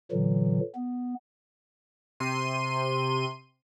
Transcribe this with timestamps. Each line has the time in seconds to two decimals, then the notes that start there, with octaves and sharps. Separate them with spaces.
0.12 A#2 D3 E3 F#3
0.75 B3
2.20 C3 C6 D#7